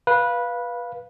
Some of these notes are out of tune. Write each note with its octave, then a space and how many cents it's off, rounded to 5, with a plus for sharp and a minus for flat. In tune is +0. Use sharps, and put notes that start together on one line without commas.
B4 -15 F5 +0